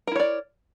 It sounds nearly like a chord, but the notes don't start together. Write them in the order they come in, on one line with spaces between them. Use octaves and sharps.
A#4 E4 C#5 D5